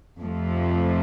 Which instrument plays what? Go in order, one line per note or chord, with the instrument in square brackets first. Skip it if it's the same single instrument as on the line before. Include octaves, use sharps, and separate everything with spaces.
[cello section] F2 C3 F3 A3